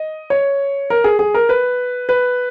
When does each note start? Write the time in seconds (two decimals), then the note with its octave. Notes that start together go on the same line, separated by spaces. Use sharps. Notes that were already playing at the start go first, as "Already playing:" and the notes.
Already playing: D#5
0.30 C#5
0.90 A#4
1.04 G#4
1.19 G#4
1.34 A#4
1.49 B4
2.09 B4